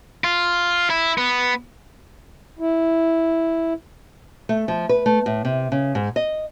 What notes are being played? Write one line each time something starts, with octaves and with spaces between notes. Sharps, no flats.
F4
E4
B3
E4
A3
F3
B4
A3
A2
C3
C#3
G#2
D#5